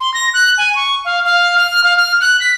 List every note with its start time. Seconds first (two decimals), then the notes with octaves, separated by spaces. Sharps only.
0.01 C6
0.14 A#6
0.34 F#6
0.58 G#5
0.75 C#6
1.05 F5
1.25 F5
1.58 F6
1.84 F5
1.97 F6
2.21 F#6
2.40 B6